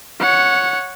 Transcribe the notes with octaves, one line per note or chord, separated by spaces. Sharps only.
C#5 F#5